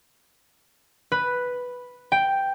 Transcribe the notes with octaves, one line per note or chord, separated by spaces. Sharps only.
B4
G5